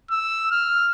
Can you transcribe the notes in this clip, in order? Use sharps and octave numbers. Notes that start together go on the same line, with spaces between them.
E6
F6